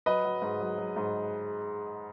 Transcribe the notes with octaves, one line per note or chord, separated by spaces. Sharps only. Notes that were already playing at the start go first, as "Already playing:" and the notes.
F#3 B4 D#5
F#3
G#2
F#3
F#3
G#2